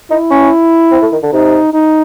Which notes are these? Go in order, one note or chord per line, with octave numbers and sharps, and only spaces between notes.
D#4 E4
C#4
C4
A3
D#3
D3
C3 D#4
D#4